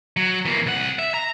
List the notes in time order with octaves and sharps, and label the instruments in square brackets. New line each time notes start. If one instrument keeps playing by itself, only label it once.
[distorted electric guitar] F#3
E3 A#3
C2 F#5
E5
A#5